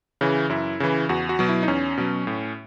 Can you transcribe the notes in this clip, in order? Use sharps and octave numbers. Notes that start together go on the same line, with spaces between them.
C#3 E3
F#2 E4
C#3 E3
E2 F#4
F#4
B2 F#3
E4
D#4
E2 C#4
B2 F#3
A2